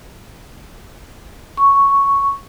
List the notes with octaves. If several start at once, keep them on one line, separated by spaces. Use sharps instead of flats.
C#6